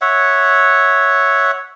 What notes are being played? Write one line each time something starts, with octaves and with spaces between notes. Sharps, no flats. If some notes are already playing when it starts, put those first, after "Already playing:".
C#5 E5 F#5